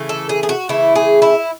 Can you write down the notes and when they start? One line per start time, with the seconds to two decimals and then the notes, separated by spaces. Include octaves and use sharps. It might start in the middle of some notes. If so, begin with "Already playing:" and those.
Already playing: C#3 E3 A3
0.09 A4
0.29 G#4
0.43 G#4
0.49 F#4
0.69 C#3 E3 A3 E4
0.95 G#4
1.22 E4